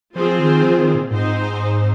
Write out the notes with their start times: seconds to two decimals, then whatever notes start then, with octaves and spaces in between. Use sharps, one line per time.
0.15 F3 C4 F4 G#4 C5
0.39 D#3
0.63 F3
0.79 D#3
0.95 A#2
1.10 G#2 C4 D#4 C5